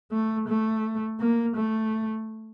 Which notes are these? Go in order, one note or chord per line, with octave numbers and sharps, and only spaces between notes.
A3
A3
A#3
A3